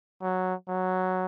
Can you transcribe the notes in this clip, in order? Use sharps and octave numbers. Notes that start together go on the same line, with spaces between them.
F#3
F#3